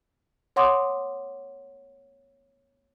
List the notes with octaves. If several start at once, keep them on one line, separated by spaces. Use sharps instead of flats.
C#5 F#5 C6 D6 D#6